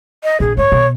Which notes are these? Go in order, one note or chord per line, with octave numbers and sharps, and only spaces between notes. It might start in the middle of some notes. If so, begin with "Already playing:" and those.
D#5
A#1 G#4
G#2 C#5
B2